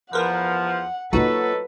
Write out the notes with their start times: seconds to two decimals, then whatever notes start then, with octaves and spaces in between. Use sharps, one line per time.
0.13 E2 F3 A#4 B4 F#5
1.13 F#3 A#3 D#4 F4 F#4 A4 B4